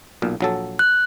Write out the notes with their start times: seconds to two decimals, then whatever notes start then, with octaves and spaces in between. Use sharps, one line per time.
0.22 B1 A#2
0.41 A#1 F#3 A4
0.79 F#6